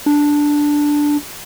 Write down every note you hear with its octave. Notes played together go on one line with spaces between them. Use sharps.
D4